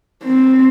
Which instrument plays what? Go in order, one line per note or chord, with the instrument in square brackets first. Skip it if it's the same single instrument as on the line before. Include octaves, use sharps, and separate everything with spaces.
[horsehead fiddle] C4